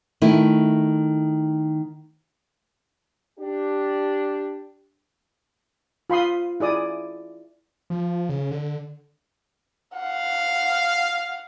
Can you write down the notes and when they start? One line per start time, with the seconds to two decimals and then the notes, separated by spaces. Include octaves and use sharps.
0.22 D#3 A3 E4
3.38 D4 G4
6.10 F4 B5 C6 D#6
6.60 E4 G#4 D5 D#6
7.90 F3
8.29 C#3
8.51 D3
9.95 F5 F#5